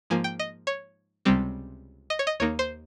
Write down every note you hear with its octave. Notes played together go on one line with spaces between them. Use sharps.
G#2 F3 A#3 G#5
G5
D#5
C#5
C#2 C3 G3 C4
D#5
C#5
D#5
D#2 D#3 A#3 D#4 C#5
C5